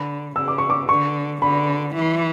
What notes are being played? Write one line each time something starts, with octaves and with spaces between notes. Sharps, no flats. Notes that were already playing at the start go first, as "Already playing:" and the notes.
Already playing: D3 B5
C#3 E6
D6
C#6
D6
D3 C#6
D3 B5
E3